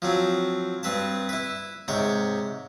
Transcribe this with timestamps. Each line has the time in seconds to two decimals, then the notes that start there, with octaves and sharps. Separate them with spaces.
0.02 F3 F#3 C4
0.83 G2 C4 B4 A5
1.29 E4 B4
1.88 G#2 C3 C#5 G5